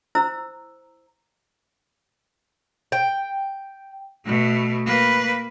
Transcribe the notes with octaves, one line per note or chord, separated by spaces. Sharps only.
E4 C5 A#5 E6
G5
B2 A3
A#3 B4